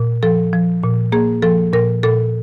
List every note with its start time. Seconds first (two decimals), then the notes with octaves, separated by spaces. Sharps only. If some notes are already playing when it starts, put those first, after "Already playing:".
Already playing: A#2
0.23 F3 A4
0.53 F3
0.83 A#2
1.12 A#3 G#4
1.42 F3 A4
1.73 A#2 A#4
2.03 A#2 A4